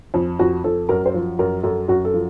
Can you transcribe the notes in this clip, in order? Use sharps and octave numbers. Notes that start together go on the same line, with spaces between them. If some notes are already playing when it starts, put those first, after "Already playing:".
F2
F2 F#4
F2 A4
F#2 A#4
C5
F3
F#2 A#4
F#2 A4
F#2 F#4
A4
F3